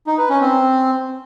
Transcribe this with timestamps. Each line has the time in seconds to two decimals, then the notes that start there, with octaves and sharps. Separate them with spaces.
0.07 D#4
0.18 B4
0.29 C#4
0.41 C4